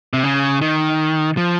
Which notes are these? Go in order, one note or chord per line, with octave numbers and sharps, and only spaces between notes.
C3
C#3
D#3
F3